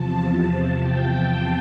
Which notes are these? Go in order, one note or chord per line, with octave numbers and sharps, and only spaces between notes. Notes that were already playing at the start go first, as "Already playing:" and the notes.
Already playing: E2 C3 F3 A5
G5